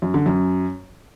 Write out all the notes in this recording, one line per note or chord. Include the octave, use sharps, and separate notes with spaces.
F#2
D3
F#2